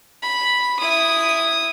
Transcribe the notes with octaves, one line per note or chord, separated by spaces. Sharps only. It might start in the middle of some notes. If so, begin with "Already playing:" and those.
B5
E4 D#6